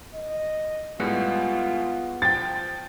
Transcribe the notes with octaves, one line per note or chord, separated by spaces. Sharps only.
D#5
A2 G3 G#3 B3 F4 F#5
F3 G5 A6